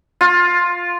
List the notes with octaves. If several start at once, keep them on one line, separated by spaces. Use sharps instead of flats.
F4